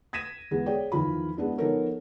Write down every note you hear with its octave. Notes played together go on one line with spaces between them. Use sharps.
G#6 A#6 B6 D#7 E7
E2 G#3 B3
G#4 C#5 D5 G5
E2 D#3 F3 F4 B5
G#3 B3 D4 E4
F3 B3 D#4 A4 A#4 C#5